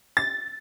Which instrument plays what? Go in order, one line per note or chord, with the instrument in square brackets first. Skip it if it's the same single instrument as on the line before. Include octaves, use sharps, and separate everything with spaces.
[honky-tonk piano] A6